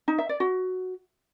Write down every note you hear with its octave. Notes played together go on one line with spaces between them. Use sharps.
D#4
E5
D5
F#4